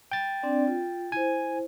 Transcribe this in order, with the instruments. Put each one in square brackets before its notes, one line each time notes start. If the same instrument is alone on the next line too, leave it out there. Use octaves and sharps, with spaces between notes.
[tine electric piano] G5 A6
[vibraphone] C4 D4 D5
F4
[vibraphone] E4 C5 [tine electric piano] G#5